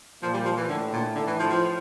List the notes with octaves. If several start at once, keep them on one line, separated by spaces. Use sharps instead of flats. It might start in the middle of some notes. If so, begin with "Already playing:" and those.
A#2 F3
G3
F3
E3
A2 D3
A#2
D3
E3
F3
F3